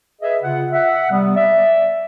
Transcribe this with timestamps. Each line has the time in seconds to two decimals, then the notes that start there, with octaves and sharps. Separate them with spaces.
0.22 G#4 B4 D#5 E5
0.43 C#3 F4 F#5
0.72 E5 F#5
1.11 C3 G3 B3
1.36 D5 E5